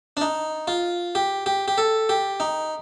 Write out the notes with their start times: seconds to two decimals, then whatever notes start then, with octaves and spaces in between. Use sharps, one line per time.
0.17 D4
0.21 D#4
0.68 F4
1.15 G4
1.46 G4
1.68 G4
1.78 A4
2.09 G4
2.40 D#4